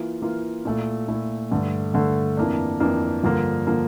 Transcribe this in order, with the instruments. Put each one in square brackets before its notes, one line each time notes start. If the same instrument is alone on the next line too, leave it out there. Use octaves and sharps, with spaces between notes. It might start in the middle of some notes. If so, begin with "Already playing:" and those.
Already playing: [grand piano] E3 A#3 F4
E3 A#3 F4
A#2 A3 E4
A#2 A3 E4
G2 D3 A3
G2 D3 A3
F2 E3 A#3 D4
F2 E3 A#3 D4
G2 D3 F3 A#3
D3 F3 A#3